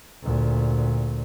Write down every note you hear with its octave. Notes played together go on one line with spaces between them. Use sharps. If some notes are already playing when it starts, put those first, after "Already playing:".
D2 A#2